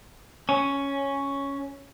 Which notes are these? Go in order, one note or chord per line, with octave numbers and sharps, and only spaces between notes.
C#4